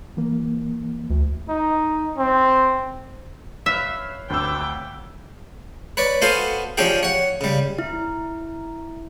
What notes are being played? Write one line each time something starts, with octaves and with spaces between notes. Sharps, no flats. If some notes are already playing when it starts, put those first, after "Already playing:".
E3 A#3
D2
D#4
C4
B4 C#5 E5 F5
D2 C4 B4 G5 D6 E6
B4 C#5 D5
B3 F#4 A4 C5 F5 G#5
F3 C#4 D4 G4 G#4 G5
C#5 F#5
C#3 G3
E4